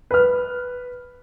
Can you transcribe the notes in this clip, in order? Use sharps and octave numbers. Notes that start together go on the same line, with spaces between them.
B4 F6